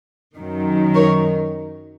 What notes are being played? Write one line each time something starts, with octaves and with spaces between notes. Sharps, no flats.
F#2 D#3 F#3
A#4 C#5